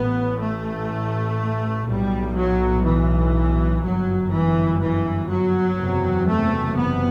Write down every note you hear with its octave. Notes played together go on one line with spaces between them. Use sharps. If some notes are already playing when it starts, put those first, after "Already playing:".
Already playing: A1 A2 B3
A3
B1 A2 G3
F#3
E3
G1 F#2 F#3
E3
E3
F#3
F#1 E2 C3
A3
B3